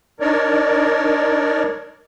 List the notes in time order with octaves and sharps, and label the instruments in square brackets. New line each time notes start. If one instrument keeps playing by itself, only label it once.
[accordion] D4 D#4 A#4 C#5 D5